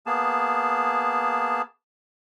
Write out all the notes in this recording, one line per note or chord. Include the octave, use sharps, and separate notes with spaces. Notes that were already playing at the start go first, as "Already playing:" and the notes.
A#3 B3 G#4 A5